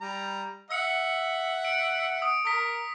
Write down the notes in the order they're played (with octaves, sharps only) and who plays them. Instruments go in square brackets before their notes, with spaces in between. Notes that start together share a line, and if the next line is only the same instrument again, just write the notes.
[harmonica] G3 A#5
[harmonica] E5 F#5 [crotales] E6 C#7
[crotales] D7
D#6 D7
[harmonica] A#4 [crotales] D#6 B6